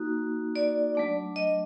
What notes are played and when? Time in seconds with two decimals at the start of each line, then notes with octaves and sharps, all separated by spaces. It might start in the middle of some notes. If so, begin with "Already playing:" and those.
Already playing: A#3 D#4 F#4
0.56 D5
0.95 F#3 A3 D4
1.36 D#5